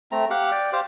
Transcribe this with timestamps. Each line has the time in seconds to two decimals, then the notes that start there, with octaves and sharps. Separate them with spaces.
0.12 A3 C4 A#5
0.30 G4 F5 F#5
0.52 D5 G5
0.73 G4 C5 F5